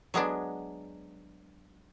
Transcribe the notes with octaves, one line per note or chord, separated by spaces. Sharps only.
F#3 G#3 B3 D4